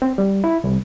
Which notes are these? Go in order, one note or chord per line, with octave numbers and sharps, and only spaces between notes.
C4
G3
E4
C2